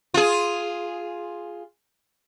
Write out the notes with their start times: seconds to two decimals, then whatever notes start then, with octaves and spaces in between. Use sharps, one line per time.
0.14 F4 G#4